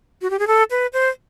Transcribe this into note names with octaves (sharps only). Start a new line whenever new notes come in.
F#4
G4
G#4
A4
B4
C5